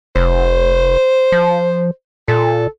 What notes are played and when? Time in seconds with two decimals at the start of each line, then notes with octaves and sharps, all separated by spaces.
0.16 F1 C5
1.32 F3
2.28 A#2 A4